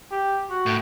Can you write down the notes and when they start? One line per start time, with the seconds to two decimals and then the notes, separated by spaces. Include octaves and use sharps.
0.11 G4
0.50 F#4
0.66 A2